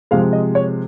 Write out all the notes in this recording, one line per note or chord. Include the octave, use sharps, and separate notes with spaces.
C3 F3 G#3 F5
D#5
C#5